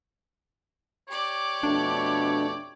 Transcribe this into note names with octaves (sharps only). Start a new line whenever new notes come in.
G4 C#5 D5
F2 B2 A3 D4